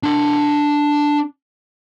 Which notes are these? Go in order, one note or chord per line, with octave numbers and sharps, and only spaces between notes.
D4 C6